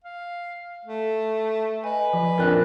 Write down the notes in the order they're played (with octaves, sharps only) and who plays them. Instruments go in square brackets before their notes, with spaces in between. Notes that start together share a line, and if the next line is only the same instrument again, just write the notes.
[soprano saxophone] F5
A3
[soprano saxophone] B4 [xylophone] D#5 G#5
[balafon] F3
[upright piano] A#1 F2 [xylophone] A#4 D5 F#6